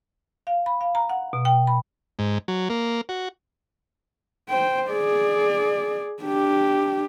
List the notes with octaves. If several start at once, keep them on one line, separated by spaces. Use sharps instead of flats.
F5
B5
F5
A#5
F#5
B2
G5
B5
G#2
F#3
A#3
F#4
C5 G5
G#4 D5
D4 G4